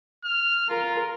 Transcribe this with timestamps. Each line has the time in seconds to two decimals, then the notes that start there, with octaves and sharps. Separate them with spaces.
0.25 F6
0.69 F4 A#4